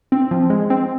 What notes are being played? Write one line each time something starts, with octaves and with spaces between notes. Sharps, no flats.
C4
F3
G#3
C4